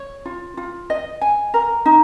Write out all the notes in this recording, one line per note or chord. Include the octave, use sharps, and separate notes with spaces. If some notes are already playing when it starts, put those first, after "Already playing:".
Already playing: C#5
F4
F4
D#5
G#5
A#4
D#4